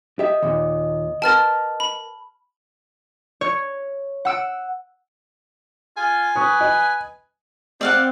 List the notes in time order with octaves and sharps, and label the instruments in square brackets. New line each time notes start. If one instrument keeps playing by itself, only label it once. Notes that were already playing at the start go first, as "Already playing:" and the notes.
[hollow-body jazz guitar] G4 E5 [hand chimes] D#5
[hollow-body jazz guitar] D#2 A#2
[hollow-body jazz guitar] A#4 B4 G5 [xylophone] A5 F6 A6
[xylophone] B5
[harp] C#5
F#5 E6 D7
[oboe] F4 [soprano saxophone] G#5
[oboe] B4 [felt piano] C#6 D#6
[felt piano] D#5
[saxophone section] C4 [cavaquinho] D5 F5 F#5